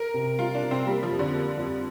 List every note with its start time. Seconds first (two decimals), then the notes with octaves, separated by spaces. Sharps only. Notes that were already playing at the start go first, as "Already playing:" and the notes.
Already playing: A#4
0.14 C3
0.39 G3 F4
0.55 D4
0.63 C3
0.71 C4
0.86 G3 A#3
1.03 F3
1.11 F2
1.19 D3
1.34 A#3
1.58 F2